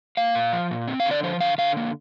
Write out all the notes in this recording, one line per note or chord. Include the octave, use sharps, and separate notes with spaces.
A#3 F5
A#2
F3
A#2
C4
F5
D3
D5
F3 C5
D3 F5
D3 F5
A#3